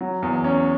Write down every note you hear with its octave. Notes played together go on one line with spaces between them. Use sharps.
F#3
E2
C#4